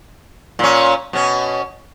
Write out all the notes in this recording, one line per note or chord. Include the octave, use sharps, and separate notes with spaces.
A#2 C#4
B2 C#4